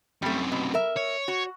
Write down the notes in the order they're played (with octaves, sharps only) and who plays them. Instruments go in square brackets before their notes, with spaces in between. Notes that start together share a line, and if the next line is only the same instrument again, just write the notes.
[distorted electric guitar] F#2 C3 [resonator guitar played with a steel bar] G3 A3
[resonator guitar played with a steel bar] B2
A#4 E5
[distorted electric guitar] C#5
[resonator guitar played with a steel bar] F#4